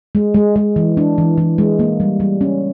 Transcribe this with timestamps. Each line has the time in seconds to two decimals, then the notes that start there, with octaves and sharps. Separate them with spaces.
0.15 G#3
0.34 G#3
0.56 G#3
0.76 E3
0.97 D4
1.18 E3
1.38 E3
1.58 G#3
1.79 A#3
2.00 G3
2.20 G3
2.41 C#4